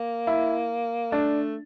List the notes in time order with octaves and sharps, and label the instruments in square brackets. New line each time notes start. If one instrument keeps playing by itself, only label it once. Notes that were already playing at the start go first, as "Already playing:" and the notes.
Already playing: [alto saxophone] A#3
[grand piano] E4
[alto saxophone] A3 [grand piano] D4